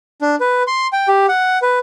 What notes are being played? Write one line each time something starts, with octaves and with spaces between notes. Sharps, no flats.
D4
B4
C6
G5
G4
F#5
B4